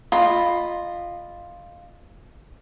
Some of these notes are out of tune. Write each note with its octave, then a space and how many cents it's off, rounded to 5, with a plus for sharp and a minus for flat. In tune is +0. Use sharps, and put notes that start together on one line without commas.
F4 +0 D#5 -20 B5 +0